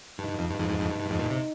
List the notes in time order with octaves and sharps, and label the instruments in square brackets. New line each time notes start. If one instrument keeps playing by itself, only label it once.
[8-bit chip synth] G2 [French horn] D#4
[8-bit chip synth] G2
F2
[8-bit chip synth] G2 [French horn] D#4
[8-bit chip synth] F2 G#2
F2 G#2
F2 G#2
G2
G2
[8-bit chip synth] F2 G#2 [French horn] D#4
[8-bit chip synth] G2 A#2
C3